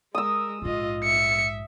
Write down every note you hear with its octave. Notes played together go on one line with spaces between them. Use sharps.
G#3 A#4 D#6 E6
A#1 G#2 F4 D#5
E5 C#7